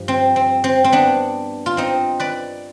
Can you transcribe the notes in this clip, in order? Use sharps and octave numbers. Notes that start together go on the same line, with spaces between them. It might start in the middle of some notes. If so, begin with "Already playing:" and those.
Already playing: G2 F3
C4
C4
C4
C4
B3 D4
F4
C4 D#4
B4 D5